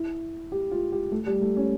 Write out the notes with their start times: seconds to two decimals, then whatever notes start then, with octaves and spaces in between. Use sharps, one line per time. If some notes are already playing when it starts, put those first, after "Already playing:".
Already playing: E4
0.52 G4
0.71 F4
0.92 G4
1.12 A3
1.27 G3
1.42 A3
1.57 C#4